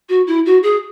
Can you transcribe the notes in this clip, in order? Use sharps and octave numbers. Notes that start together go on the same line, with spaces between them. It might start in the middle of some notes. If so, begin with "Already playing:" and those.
F#4
E4
F#4
G#4